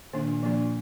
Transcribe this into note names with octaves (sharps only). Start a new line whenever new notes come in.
A#2 D#3 A#3 D4
F3 A#3 D4